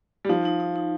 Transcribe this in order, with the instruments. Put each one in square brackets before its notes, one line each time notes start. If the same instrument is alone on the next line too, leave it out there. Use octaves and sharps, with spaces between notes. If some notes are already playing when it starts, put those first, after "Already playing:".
[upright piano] G3
[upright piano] F3 [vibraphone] D#4
[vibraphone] D#4
D#4
D#4